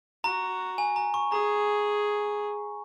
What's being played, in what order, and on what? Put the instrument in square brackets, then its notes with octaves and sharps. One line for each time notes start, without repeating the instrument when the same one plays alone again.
[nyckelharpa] F#4 [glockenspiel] A#5
[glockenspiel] G#5
A#5
C#6
[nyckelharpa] G#4 [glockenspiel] A#5